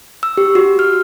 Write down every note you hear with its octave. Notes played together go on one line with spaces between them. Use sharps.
E6
G4
F#4
F6